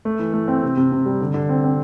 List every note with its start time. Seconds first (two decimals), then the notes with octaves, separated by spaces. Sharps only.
0.05 A3
0.19 E3
0.34 A3
0.48 C4
0.63 C3
0.77 C3
0.92 C3
1.06 G3
1.21 D3
1.34 D3
1.49 C4
1.64 C4